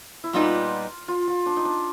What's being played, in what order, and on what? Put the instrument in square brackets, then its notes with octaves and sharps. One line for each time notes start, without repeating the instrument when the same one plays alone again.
[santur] E4
[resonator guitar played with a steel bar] A#2 G3 B3 D#4 [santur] F4
[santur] F4
F4
D4
D#4
D4